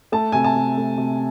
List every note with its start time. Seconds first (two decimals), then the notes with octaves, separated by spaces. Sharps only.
0.12 A3 A5
0.32 C3 G#5
0.44 A5
0.56 C3
0.77 A3
0.98 C3